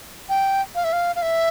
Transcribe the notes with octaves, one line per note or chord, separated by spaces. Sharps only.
G5
F5
E5
F5
F5
E5